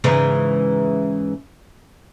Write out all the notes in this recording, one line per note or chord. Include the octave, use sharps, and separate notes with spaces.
G#2 C#3 E3